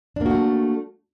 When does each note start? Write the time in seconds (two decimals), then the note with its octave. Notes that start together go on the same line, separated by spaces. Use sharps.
0.16 D4
0.21 A#3
0.26 F#4
0.30 A3